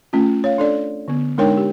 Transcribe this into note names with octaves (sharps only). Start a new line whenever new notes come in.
A3 C#4 F4
C#5 F5
D4 A4 D5
D3 B3
G#3 D4 D#4 A#4 C#5 G5
G4